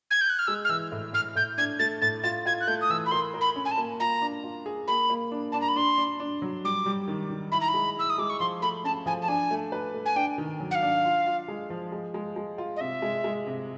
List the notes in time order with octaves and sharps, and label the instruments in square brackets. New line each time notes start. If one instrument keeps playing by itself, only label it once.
[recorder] G#6
G6
F#6
F6
[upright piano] G#3 [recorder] E6
[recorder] F6
[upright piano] E3 [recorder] E6
[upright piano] A2
[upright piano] A2 [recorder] F6
[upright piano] A2 [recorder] G6
[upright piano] D4 [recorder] G#6
[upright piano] A3 [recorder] A6
[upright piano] A2 [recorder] A6
[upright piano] F4 [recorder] A6
[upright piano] F4 [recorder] G#6
[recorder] F#6
[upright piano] A3 [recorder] G6
[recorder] D#6
[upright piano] E3 [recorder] E6
[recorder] B5
[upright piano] A#4 [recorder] C6
[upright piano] A#4
[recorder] B5
[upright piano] C#4
[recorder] G#5
A5
[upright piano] A#3
[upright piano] F4 [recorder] A#5
[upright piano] D4
F4
G#4
[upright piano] A#3 [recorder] B5
[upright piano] A#3
D4
[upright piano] D4 [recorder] A5
[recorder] A#5
B5
[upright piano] D4 [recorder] C6
[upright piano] D4
D4
F#3
[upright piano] G3 [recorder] D6
[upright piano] G3
D#3
D#3
[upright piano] E4 [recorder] B5
[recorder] A#5
B5
[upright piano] G#3
[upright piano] E4 [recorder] E6
[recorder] D#6
[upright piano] G#3 [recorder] D6
[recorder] C#6
[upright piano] F3 [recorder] C6
[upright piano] A3 [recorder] B5
[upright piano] C#4 [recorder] A5
[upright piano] F3 [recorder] G#5
[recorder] A5
[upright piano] D4 [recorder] G#5
[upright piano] A3
B4
A3
[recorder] G#5
[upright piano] D4 [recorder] G5
[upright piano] D#3
F#3
[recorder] F#5
F5
[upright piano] D4
F4
F4
G#3
F3
G#3
G#3
G#3
F4
[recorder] D#5
[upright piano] C3 [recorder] E5
[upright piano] G#3
G#3
C3